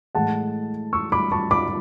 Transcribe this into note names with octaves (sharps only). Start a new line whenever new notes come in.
A2 E3 G#3 F#5 A5
C#6 E6
B5 D6
A5 C#6
B5 D6